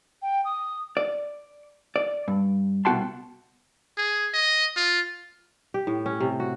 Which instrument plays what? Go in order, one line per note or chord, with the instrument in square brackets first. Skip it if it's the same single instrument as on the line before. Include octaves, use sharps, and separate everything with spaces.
[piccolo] G5
D#6
[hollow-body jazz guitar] D5
D5
G2
C2 B2 F#4 G5 A5 C6
[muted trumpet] G#4
D#5
F4
[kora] G4
A2
C#4
C3
F#4